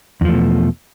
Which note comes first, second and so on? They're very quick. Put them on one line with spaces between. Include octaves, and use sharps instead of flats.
E2 F3 A3 B2